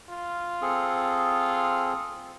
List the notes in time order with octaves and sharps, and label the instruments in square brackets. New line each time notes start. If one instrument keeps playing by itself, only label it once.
[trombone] F4
[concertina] C4 G#4 A4